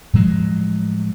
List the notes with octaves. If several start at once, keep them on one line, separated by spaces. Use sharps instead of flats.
A2 F3 F#3 G#3